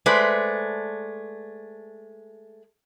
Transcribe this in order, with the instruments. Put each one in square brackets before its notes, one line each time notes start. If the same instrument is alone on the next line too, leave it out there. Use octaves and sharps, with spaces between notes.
[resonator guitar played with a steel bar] G#3 A3 B4 C5 D5